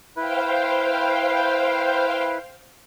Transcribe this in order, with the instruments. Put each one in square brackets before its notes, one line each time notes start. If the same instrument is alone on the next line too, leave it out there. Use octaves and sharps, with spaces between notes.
[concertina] E4 B4 [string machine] C5 F5 G5